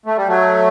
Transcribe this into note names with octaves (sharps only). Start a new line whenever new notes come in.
A3
G3
F#3 A3